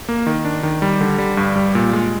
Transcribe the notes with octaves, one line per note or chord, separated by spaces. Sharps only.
A#3
D#3
D4
D#3
G3
D3
G3
G2
G3
A#2
G#3